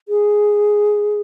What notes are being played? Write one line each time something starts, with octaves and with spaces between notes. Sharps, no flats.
G#4